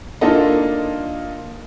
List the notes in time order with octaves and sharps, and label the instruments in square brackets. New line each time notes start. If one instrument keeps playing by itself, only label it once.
[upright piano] A#3 D4 D#4 F4 A4 D#5